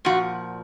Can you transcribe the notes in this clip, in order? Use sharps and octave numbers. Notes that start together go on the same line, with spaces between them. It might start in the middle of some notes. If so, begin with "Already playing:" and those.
A#2 F3 F#4